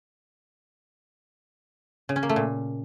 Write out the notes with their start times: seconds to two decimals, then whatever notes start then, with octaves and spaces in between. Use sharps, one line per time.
2.09 C#3
2.16 C#4
2.23 A#3
2.29 A3
2.36 A#2